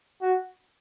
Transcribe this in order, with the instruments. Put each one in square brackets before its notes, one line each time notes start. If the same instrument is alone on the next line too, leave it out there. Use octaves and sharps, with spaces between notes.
[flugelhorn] F#4